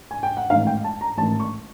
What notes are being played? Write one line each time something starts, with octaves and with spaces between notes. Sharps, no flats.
G#5
G5
F#5
A1 G#2 D#3 F5
G5
A5
A#5
A1 G#2 D#3 A5
C#6